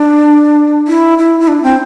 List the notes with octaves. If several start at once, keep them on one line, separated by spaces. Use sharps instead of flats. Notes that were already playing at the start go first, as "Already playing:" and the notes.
Already playing: D4
E4
E4
E4
D4
C4